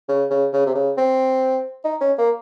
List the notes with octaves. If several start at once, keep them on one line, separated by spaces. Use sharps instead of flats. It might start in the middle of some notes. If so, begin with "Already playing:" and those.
C#3
C#3
C#3
C3
C#3
C4
D#4
C#4
A#3